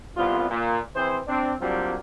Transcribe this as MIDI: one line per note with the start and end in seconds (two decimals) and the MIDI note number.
0.16 0.47 36
0.16 0.47 59
0.16 0.47 65
0.50 0.79 46
0.96 1.18 52
0.96 1.18 60
0.96 1.18 68
0.96 1.18 72
1.28 1.54 60
1.28 1.54 62
1.61 1.96 54
1.61 1.96 55
1.61 1.96 58
1.61 1.96 60
1.61 1.96 62
1.61 1.96 65